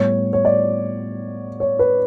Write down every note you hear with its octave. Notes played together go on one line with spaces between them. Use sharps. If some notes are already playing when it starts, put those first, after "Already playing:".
Already playing: A2 G3 B3 C#5
C#5
D5
C#5
B4